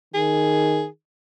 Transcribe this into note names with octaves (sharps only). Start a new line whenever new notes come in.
D#3 G#4